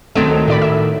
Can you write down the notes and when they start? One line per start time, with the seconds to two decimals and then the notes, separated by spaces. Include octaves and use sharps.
0.15 C#2 D#3 F#3 A3 C4 D7
0.48 A2 D5 B5
0.62 E5